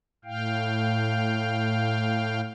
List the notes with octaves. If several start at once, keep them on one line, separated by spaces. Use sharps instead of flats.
A2 F5 G5